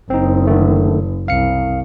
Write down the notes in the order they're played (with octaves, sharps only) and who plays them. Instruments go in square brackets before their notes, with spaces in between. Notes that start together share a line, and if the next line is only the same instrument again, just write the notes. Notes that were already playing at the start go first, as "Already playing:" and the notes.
[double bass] F#1 [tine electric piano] C4 D#4
[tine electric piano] D3 D#3 A3
[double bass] C2 [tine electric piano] F5 C#7